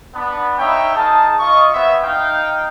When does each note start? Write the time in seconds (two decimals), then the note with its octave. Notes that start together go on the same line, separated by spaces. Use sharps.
0.15 B3 D4
0.58 D#4 C#5 E5 F5 G5 B5
0.95 D#4 G#4 A#4 A5
1.40 F4 D#5 C#6
1.72 B3 C4 C#5 E5
2.03 D#4 F5 G5